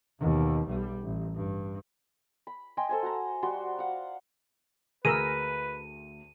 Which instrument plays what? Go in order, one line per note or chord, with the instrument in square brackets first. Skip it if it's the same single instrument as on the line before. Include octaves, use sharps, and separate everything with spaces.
[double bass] D#2 B2
B1 G3
A1
G2
[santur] B5
D#5 G5 G#5 C6
A4 C5 G#5
F#4 F#5 A#5
G3 F#4 D5 C6
F5 F#5
[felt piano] D2 A#6 [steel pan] G#4 A#4 E6 [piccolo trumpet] B4 [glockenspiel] D#7